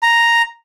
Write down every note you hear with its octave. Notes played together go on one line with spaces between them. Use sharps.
A#5